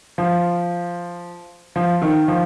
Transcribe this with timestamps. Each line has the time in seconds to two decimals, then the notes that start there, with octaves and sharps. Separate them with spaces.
0.18 F3
1.76 F3
2.02 D#3
2.28 F3